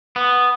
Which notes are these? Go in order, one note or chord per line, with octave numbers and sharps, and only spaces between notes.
B3